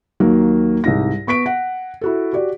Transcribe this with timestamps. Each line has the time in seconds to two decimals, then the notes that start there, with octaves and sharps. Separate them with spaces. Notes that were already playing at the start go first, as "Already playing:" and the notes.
0.20 D#2 D#3 F#3 A#3 A#4
0.84 C2 G#2 A#6
1.27 B3 C#6 B6 D7
1.46 F#5
2.01 E4 F#4 A4
2.33 F#4 G4 D5